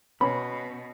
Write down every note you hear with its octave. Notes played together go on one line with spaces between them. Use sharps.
B2 B3 C#4 B5